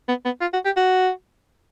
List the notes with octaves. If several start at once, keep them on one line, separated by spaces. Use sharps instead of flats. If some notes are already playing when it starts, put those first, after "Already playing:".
B3
B3
F4
F#4
G4
F#4